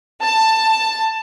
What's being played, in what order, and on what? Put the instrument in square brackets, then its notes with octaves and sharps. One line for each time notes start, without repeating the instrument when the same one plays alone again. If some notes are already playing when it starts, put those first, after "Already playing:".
[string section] A5